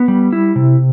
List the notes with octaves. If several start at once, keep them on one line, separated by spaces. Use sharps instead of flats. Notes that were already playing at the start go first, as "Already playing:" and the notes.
Already playing: B3
G3
E4
C3